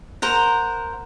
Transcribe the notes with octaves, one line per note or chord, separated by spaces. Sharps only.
A#4 C5 F#5